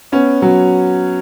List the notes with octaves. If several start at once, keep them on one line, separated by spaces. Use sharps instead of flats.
B3 C#4
F#3